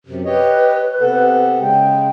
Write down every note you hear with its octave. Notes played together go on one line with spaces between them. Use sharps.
F#2 C3
G4 B4 C#5 D#5
C3 B3 A4
C#3 G#3 G5